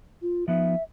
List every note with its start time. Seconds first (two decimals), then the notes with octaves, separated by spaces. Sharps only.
0.22 F4
0.48 F3 B3 D#4 E5